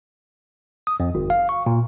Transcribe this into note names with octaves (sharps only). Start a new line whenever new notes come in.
D#6
F2
G1
F5
C#6
A#2